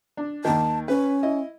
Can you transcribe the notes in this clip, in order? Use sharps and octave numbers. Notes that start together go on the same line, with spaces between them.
D4
D#2 D#3 A5
C#4 B4
E4 D#5